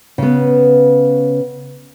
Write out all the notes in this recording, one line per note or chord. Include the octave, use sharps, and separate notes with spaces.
C#3 B3